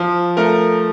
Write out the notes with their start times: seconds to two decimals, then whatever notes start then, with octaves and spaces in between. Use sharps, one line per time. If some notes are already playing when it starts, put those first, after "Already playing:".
Already playing: F3
0.37 A3 A#4